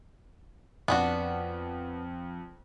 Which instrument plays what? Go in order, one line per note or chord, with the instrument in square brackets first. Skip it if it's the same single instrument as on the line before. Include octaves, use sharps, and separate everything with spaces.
[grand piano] F2 [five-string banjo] B3 D4 F#4